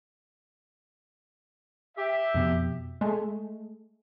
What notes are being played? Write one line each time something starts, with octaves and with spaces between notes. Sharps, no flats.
G4 E5
F2 B2
G#3 A3